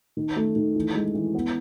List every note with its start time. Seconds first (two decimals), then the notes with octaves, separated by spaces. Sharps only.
0.17 D#3
0.36 A3
0.56 D#3
0.75 E3
0.95 G#3
1.15 E3
1.34 B3